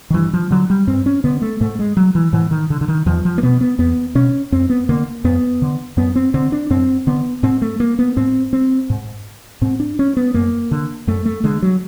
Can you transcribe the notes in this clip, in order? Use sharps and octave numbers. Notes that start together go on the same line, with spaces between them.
D#3
G2 E3
F3
D3 F#3
G3
G2 C4
C#4
D3 B3
A3
G#2 A3
G#3
F#3
E3
G#2 E3
D#3
D3
D3
D#3
E2 F3
F3
A#3
B2 B3
B3
E2 B3
B2 C#4
F2 C4
B3
D3 A#3
F2 B3
D3
F#2 B3
C4
D3 C4
D4
F#2 C4
D3 B3
G#2 C4
A3
A#3
B3
G#2 C4
C4
G#2
G#2 C4
D4
C#4
B3
F#2 A#3
D3
F#2 A3
A3
D3 G#3
F#3